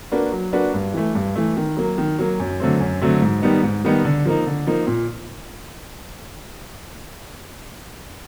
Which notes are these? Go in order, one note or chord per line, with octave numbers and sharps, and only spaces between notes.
A#3 D4 F#4 B4
F#3
A#3 D4 F#4 B4
G2
E3 A3
G2
E3 A3
D#3
F#3 A#3
D#3
F#3 A#3
F#2
D3 F#3 A3 C4
F#2
D3 F#3 A3 C4
G#2
D#3 G3 B3 D#4
G#2
D#3 G3 B3 D#4
D3
F3 A#3 D#4
D3
F3 A#3 D#4
A#2